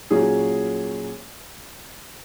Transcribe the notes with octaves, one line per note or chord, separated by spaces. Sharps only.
A#2 F#3 C#4 G#4